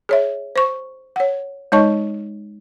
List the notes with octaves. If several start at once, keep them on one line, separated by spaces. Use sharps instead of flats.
G#4 C#5 E5
C5 C#6
C#5 F#5
G#3 D#4 C#5 D#5 A5 C#6